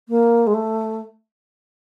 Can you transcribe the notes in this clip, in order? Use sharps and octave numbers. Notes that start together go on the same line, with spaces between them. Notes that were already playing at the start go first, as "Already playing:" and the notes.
A#3
G#3
A3